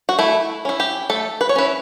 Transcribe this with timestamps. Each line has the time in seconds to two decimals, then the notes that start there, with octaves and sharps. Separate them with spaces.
0.09 F#4
0.19 A3 E4
0.65 C#4 E4
0.80 G4
1.10 A3 A4
1.41 B4
1.49 C#5
1.56 C#4 E4 B4